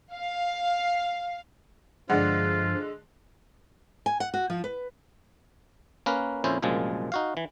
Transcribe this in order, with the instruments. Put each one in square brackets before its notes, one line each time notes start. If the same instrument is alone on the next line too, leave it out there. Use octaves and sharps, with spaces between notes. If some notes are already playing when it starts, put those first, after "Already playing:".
[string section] F5
[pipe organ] G2 F3 [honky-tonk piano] D3 G#3 [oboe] F4 [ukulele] D5 F#5
[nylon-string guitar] G#5
F#5
F#4
F3
B4
[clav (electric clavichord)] A#3 C#4 A#4 B4
F2 A#2 C#4 E4 C5
C2 F#2 A#2 F3 G#3
D#4 F#4 F5
E3